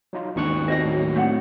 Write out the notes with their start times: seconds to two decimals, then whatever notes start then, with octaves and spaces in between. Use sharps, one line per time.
0.13 F#3 D#4 F4
0.36 D#2 G#2 D#3 D4 C#6 F#6
0.68 C4 F#4 D#5 A#6
0.84 A2 F#3
1.16 A3 C4 F#5